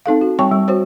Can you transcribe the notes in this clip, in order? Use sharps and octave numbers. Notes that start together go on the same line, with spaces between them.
C4 D#4 A4 F5
F#4
G3 C4 C#5 G5 C#6
G3
F#4 C5 C#5